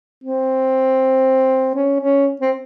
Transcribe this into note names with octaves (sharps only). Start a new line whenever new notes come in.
C4
C#4
C#4
C4